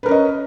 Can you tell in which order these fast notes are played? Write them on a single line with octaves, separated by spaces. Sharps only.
B4 A#4 C#4 D#5